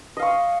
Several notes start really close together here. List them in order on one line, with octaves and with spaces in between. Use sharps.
D#5 F5 C#6